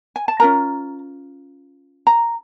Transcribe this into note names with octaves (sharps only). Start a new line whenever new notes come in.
G#5
A5
C#4 F4 A#4 A#5
A#5